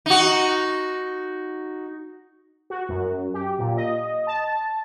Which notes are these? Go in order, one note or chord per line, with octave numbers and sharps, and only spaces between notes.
D#4 F#4
F#4
F#2
G4
A#2
D#5
A5